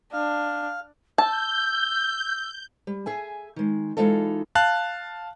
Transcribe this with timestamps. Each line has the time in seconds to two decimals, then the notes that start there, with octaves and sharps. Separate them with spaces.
0.13 D4 F5
1.18 A5 E6 G6
2.87 G3
3.06 G#4 E5 G#5
3.56 D#3 G#3
3.97 E3 G3 G#3 D#4 F4 A4
4.55 F5 A5 F#6